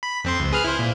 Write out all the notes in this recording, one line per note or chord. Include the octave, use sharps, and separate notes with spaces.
B5
F2 C4 C6
C#2
G#4 B4 F6
E4 C5
A#2